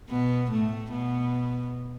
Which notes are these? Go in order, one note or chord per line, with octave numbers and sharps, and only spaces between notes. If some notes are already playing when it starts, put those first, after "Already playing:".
B2 B3
A2 A3
B2 B3